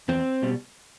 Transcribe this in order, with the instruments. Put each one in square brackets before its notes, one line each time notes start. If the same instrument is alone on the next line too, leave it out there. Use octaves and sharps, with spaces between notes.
[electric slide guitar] E2 C4
B2 G3